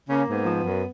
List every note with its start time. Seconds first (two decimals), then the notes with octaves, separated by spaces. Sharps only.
0.09 C#3 A#3 C#4
0.28 G#2 B3
0.46 F3
0.65 F#2